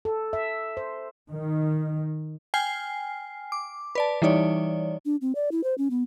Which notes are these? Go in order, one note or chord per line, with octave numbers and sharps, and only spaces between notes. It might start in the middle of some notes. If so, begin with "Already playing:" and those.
A4
E5
C5
D#3
G5 G#5 F6 C7
D6
B4 D5 A5
E3 G3 D#4 C#5 D5
D4
C4
D5
E4
C5
C#4
B3